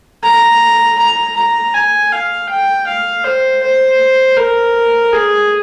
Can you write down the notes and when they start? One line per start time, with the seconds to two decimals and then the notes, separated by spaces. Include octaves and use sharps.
0.23 A#5
0.99 A#5
1.36 A#5
1.74 G#5
2.12 F5
2.50 G5
2.87 F5
3.25 C5
3.63 C5
4.37 A#4
5.13 G#4